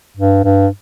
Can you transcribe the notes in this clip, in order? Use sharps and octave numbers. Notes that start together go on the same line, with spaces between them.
G2
G2